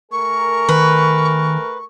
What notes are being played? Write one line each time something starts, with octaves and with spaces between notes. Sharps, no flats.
A3 G#4 A#4 C#6
D#3 B4